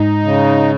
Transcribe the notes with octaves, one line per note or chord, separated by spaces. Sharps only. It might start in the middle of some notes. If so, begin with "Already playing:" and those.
Already playing: G#2 D#4
C#3